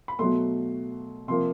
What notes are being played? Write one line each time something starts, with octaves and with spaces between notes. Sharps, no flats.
B5
B2 F#3 A3 C6
C3 F3 A#3 C6